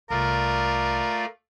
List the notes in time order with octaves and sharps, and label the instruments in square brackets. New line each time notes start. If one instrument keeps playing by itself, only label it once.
[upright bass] C2 [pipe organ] A3 F4 D5 [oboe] A#4